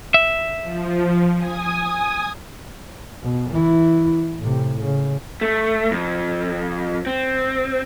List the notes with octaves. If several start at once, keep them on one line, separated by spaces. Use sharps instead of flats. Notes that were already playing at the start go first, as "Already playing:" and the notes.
E5
F3
G#5 D#6
B2
E3 E4
A2 C3
C#3
A3
F2
C4